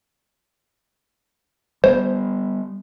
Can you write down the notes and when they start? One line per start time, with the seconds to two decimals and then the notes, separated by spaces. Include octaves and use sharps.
1.84 G3 A#3 B3 C5